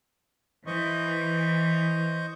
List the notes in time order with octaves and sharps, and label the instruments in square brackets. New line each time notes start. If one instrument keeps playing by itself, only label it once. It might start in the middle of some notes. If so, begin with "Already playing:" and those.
[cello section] E3 [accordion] C5 D#5 C#6